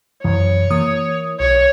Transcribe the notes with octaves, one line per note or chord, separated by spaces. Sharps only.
F#2 C3 E3 C#5
E3 A#3 D#6
B1 C#5